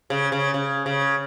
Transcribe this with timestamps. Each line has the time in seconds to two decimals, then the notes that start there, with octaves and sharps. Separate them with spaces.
0.10 C#3
0.32 C#3
0.54 C#3
0.86 C#3